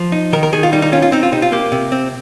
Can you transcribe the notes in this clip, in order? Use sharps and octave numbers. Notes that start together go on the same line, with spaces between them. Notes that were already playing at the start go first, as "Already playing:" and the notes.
Already playing: F3
D#4
D#3 A#4
A#4
D#3 G#4
F4
G3 D#4
D#4
C#4 F4
F4
C4 D#4
F4
C3 D#4
F4
A#3 G4
C3
C4